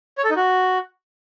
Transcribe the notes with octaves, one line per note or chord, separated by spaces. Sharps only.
C#5
A4
D#4
F#4